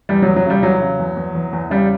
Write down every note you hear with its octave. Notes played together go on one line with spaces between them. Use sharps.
E2 G3
E2 F#3
F#3
C#3 G3
E2 F#3
C#3
E2
E2
E2
E2
C#3 G3